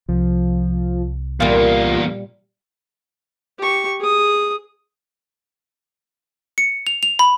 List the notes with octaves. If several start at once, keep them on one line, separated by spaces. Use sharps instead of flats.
C2 F3
E2 A#2 G3 A#3 F4
G4 C#6
G#4 D#6
C#7
F7
F7
B5